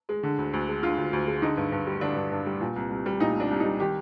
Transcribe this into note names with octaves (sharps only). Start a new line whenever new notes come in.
G#3
D3
D2
D2
G#3
D3 F4
D2
D2
G#3
D3 D#4
G2
G2
G3
D3 D4
G2
G2
G3
A#2
C2
C2
G3
A#2 D#4
C2 D4
C2
D#4
G3
D#3 G4